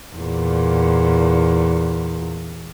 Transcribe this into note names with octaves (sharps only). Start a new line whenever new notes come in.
E2 A#2